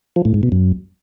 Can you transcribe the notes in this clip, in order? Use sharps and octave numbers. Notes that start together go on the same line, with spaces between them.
F3
A2
G#2
B2
F#2